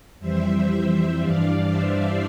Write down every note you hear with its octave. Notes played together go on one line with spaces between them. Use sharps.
F2 E3 G3 C5 E5
G2 E3 G3 D4 D5 F5
C5 E5